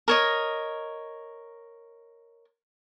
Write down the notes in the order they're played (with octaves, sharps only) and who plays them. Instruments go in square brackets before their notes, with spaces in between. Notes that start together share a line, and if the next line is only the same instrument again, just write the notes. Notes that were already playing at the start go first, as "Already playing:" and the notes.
[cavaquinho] A#4 C#5 D#5